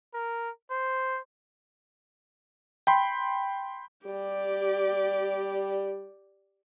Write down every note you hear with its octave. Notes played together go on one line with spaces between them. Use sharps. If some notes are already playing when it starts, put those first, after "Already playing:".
A#4
C5
G5 B5 C6
G3 G4 D5